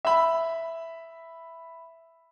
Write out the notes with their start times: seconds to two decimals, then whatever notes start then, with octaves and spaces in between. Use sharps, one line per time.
0.05 E5 B5